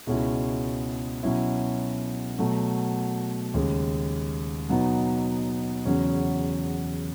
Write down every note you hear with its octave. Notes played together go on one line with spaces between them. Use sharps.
C#2 B2 G#3 C#4 E4
B2 F#3 C#4 E4
B2 F#3 A3
D#2 C#3 G#3
B2 F#3 B3 D#4
E2 C#3 F#3 C#4